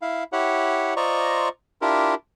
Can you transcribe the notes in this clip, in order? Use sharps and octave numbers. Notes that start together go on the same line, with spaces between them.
E4 F5
E4 G4 C#5 F#5
F4 C5 D5 D#5 A#5 C#6
D4 E4 F4 G4 A#4